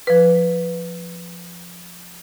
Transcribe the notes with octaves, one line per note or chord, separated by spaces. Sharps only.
F3 B4